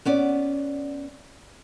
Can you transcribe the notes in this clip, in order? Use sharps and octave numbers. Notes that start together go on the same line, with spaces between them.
B3 C#4 D5